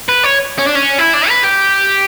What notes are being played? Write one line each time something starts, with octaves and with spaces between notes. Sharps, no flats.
B4
C#5
C#4
D4
C#4
E4
D4
B4
G4